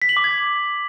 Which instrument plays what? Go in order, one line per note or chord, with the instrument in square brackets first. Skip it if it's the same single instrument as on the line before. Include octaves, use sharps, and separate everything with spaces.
[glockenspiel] B6
F#7
D6
G#6